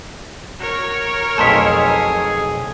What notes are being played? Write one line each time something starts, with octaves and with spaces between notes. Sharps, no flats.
F#4 A#4 C#5
B1 F2 A3 G#4 A5 C6 B6